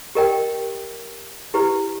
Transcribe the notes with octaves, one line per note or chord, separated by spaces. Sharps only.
G4 A#4 D#5 G5
E4 G4 B4